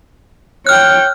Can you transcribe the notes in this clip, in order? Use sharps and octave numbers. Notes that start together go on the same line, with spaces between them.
C#5 G5 F6 F#6